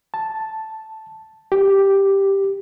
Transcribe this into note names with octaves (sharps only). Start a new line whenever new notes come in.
A5
G4